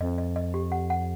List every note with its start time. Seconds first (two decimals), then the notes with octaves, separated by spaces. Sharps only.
0.01 F2 D#5
0.18 D#5
0.36 D#5
0.54 G4
0.72 F#5
0.90 F#5